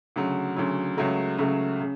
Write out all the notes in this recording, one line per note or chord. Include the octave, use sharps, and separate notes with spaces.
D2 C#3 F#3
D2 C#3 F#3
C#2 C#3 F#3 A3
C#2 C#3 F#3 A3
C#3